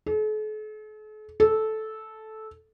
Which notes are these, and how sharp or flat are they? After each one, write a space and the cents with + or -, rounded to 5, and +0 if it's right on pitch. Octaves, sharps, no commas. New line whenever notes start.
A4 -45
A4 -10